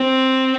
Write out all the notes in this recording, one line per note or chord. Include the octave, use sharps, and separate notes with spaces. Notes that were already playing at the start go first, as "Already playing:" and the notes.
Already playing: C4